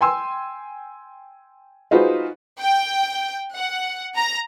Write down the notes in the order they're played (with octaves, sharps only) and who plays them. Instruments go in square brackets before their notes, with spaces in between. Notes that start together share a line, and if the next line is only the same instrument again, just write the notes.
[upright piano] G5 G#5 C6 E6
D#4 F4 F#4 G#4 B4 C5
[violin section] G5
F#5
A#5